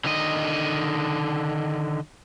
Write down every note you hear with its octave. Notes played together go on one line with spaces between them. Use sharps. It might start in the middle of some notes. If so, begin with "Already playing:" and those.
D3 D#3 D#5